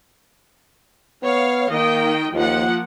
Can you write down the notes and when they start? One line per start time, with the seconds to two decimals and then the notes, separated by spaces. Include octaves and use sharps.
1.23 B3 C#5 F5
1.70 D#3 A#3 D#5 G5
2.34 D#2 F3 A#3 F#5